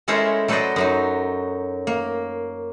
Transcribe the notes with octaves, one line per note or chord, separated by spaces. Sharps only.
G#3 C#4 E4 A4 A#4 C5
F#3 A4 B4 C5 D5 D#5
F#2 F#3 D#4
A#3